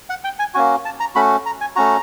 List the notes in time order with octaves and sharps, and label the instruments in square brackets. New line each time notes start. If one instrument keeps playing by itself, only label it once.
[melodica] F#5
G5
G#5
A#3 C#4 F#4 G#5
A5
A#5
A3 C#4 F#4 B5
A#5
G#5
A3 C#4 F#4 A#5